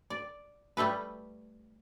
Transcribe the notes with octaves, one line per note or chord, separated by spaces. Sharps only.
D5
G3 A3 A4 B4